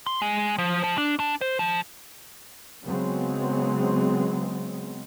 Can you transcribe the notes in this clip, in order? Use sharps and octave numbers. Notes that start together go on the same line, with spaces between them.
C6
G#3
F3
F3
D4
D4
C5
F3
C#3 F#3 G#3 B3 C4